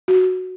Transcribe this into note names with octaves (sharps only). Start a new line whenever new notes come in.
F#4